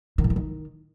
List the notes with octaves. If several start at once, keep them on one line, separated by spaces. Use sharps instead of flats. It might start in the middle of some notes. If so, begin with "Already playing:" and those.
D#3
A2
E3
D#3